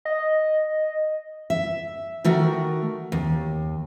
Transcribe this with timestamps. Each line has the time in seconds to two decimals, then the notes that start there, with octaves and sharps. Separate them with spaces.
0.05 D#5
1.50 E5
2.24 D#3 A3 F#4 A#4
3.12 D#2